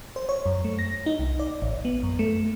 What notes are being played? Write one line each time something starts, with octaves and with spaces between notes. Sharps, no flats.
C5
C#5
F#2
A3
A#6
D#4
C2
D5
A1
B3
F#2
A3